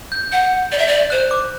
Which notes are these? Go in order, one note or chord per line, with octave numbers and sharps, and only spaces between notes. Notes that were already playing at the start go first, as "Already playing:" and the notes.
G6
F#5 G6
D5
E5
D5
C5 F#6
D6